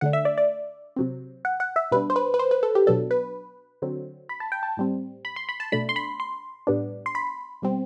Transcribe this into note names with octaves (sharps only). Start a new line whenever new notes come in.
D3 A3 D4 F#5
E5
D5
D5
C3 F#3 C4
F#5
F#5
E5
B2 G3 D4 B4
C5
B4
B4
C5
B4
A4
G4
B2 F#3 B3 D4 A4
B4
D3 F#3 C4
B5
A5
G5
A5
A2 G3 C4
B5
C6
B5
A5
B2 A3 D4 B5
C6
B5
C6
A2 G3 B3 D4
C6
B5
B2 G3 C4